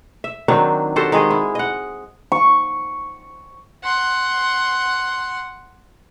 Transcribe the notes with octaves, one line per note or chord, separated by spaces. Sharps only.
E5
D#3 F#3 C4 D4
F#4 G4 A4 C5
D#3 G#3 G#4 D#5
E4
D#5 F#5
C#6
F#5 C6